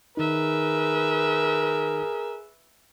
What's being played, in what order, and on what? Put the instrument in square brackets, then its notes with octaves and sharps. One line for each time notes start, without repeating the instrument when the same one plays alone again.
[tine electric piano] D#3 D#4 [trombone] G#4 [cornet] A#4 [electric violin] B4 E5